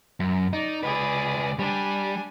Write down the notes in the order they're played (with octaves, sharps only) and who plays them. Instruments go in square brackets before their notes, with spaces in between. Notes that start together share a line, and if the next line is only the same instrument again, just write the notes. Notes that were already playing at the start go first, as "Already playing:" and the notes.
[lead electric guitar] F#2
[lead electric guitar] D#4 [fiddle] D5
[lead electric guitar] C#2 B4 [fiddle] G#4 D5
[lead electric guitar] G3 [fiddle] D4 G#5